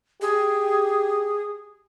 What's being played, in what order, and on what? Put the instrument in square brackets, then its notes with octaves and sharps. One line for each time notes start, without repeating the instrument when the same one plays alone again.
[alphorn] G4 [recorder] G#4